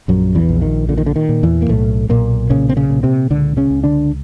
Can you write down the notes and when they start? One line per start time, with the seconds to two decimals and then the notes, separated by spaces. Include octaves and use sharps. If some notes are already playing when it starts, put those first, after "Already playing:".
0.08 A#1 F#2 F#3
0.35 E2 E3
0.49 A#1
0.62 D#3
0.89 A#2 D3
0.98 D#3
1.06 D3
1.16 D#3
1.29 A#2
1.43 E2 E3
1.62 A#3
1.69 B1 A2 A3
2.09 B1 A#2 A#3
2.50 A#2 C#3 C#4
2.69 C4
2.77 C#3 C#4
2.90 A#2
3.03 C3 C4
3.31 C#2 D3 D4
3.57 C#3 C#4
3.70 C#2
3.84 D3 D4